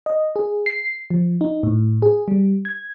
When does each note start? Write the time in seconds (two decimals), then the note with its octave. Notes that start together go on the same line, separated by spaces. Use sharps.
0.06 D#5
0.36 G#4
0.66 C7
1.10 F3
1.41 D#4
1.63 A2
2.02 G#4
2.28 G3
2.65 G#6